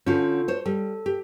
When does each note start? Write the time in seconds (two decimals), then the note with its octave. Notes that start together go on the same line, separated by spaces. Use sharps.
0.06 D3 C#4 F4 F#4 A4
0.48 C5 C#5
0.66 G3 A4
1.06 G4